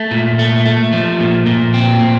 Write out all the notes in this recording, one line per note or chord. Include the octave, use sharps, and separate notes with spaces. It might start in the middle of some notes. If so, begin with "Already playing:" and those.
Already playing: A3
A#2
A3
A3
F3
A#2
A#2
C4
A#2